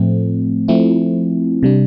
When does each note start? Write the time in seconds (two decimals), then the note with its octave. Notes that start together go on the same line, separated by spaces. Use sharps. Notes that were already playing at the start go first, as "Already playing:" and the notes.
Already playing: A2 F3 A3 C4
0.68 F3 A3 C4 E4
1.63 C3 G3 D4